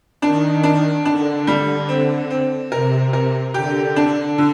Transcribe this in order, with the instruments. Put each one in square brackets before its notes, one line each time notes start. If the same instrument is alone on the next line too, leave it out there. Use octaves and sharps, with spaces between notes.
[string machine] D#3 [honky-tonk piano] D4
[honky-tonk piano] D4
[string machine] D3 [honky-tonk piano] D4
[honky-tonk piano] G3
C4
C4
[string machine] C3 [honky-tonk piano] A#4
[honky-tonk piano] A#4
[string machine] D3 [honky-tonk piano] G4
[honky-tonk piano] D4
D3